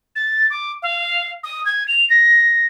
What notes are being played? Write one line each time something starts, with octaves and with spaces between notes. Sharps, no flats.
A6
D6
F5
D#6
G#6
F7
A#6